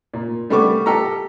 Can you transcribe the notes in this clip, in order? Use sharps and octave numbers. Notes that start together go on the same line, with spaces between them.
A#2
C#3 G3 A3 B3 C#6 D6
G4 A4 A#5